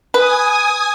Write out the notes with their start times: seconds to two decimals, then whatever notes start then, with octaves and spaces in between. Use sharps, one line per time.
0.14 B4 G#5 D#6